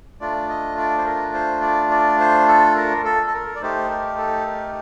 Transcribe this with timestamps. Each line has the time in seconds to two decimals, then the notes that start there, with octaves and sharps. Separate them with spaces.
0.20 A3 D4 F4 D5
0.49 D#5
0.78 D5
0.98 C5
1.06 A#4
1.34 C5
1.62 D5
1.91 D5
2.20 C5
2.48 A4
2.76 A#4
3.05 A4
3.27 A4
3.34 A#4
3.55 D5
3.62 A3 D#4 G4 C5
3.90 A#4
4.18 A4
4.46 A#4